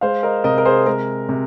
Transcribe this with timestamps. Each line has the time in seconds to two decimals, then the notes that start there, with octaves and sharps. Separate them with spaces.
0.01 G#3 C5 F5
0.23 A#4 D#5
0.44 C3 A#4 D#5
0.58 A#4
0.65 G#4 C5
0.86 G#3 A#4
1.29 C3